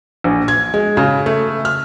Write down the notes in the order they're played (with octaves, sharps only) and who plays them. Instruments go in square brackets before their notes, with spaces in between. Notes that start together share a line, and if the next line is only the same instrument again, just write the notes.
[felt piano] A#1
G#6
G#3
C#3
A3
F6